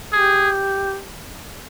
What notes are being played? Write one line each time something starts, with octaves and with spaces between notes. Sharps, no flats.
G4 G#4